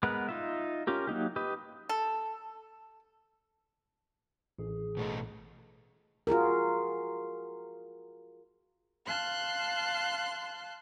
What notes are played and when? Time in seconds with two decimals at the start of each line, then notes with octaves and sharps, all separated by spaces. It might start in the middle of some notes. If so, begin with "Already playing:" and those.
0.03 G#3 B3 A#4 B4 F#5
0.29 D#4 F4 E5
0.87 C#4 F4 G4 A#4
1.07 F#3 A#3 D#4 G4
1.36 G4 B4 D#5
1.89 A4
4.59 A1 G#4
4.97 B2 A3 D#5
6.27 F4 F#4 G#4 A#4
9.07 F5 A5 C6 F#6